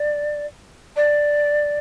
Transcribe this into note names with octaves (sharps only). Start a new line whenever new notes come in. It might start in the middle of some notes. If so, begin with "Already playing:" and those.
Already playing: D5
D5